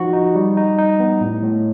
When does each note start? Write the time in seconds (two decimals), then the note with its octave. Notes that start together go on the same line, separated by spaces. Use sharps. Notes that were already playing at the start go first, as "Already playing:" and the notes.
Already playing: F3 D#4 F#4
0.13 D#4
0.35 G3
0.57 D#4
0.79 D#4
1.00 B3
1.21 A2
1.43 A2